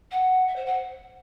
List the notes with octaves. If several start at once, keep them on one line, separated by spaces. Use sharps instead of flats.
F#5
E5
C5
F#5